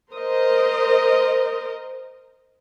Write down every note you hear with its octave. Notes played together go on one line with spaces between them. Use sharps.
A#4 C5 D#5